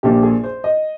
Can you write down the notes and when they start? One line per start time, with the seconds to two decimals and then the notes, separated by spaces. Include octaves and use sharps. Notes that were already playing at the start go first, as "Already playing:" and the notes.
0.03 A#1 A#2 F3 G4
0.23 G#4
0.44 C5
0.64 D#5